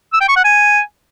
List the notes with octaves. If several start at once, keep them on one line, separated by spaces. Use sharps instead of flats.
E6
G5
C#6
F#5
G#5